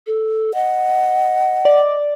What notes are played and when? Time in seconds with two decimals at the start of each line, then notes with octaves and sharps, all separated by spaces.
0.07 A4
0.54 D#5 F#5
1.65 D5